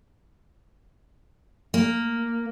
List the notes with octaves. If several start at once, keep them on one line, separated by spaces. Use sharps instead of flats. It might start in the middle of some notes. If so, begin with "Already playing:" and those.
A#3